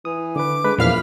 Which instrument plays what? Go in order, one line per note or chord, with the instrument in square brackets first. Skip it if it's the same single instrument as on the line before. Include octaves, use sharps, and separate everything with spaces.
[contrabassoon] E3 [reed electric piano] D#6
[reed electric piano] D3 B4 [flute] D6
[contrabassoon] D3 [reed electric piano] G#3 B4
[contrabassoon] F#1 [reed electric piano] E2 F3 E4 [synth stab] A#2 F5 F6 [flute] B5